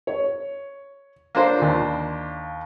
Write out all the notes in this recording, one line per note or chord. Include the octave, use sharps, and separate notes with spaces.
C#5
A#3 D4 C5
D#2 F4